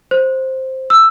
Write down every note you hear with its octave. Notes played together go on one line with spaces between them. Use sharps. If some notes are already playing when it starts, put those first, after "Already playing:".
C5
E6